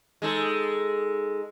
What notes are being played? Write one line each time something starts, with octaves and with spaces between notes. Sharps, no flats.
G#3 D#4 A4